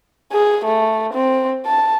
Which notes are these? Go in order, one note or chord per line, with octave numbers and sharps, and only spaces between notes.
G#4
A3
C4
A5